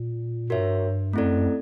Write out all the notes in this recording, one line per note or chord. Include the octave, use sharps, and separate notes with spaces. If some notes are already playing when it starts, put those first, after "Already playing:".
Already playing: A#2
G2 F#4 A#4 C#5 E5
F#2 A3 C4 E4 A4 D5